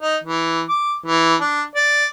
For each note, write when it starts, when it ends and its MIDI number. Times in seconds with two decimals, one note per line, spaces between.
0.01 0.17 63
0.24 0.62 52
0.69 0.96 86
1.06 1.35 52
1.41 1.62 62
1.76 2.06 74